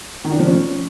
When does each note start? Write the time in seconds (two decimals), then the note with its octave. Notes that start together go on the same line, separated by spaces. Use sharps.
0.24 D#3
0.32 D4
0.39 F3
0.47 C#4